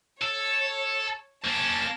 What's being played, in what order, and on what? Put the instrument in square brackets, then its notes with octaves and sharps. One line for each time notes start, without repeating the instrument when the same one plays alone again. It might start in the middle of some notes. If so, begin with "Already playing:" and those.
[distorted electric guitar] A4 [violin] C#5
[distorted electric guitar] A#3 C#4 [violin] A5 A#6